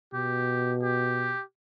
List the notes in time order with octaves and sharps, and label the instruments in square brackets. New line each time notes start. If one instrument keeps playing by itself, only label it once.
[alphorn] B2 [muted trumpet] G4
[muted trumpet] G4